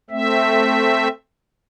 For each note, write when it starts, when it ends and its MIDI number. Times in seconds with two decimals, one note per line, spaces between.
0.10 1.08 57
0.10 1.08 60
0.10 1.08 76